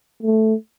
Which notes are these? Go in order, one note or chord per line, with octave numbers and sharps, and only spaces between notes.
A3